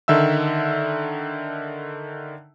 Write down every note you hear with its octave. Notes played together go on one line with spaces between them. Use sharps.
D3 D#3 E5 E6